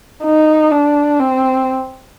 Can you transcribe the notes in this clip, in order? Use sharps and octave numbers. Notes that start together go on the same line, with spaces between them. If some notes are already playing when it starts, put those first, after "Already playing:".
D#4
D4
C4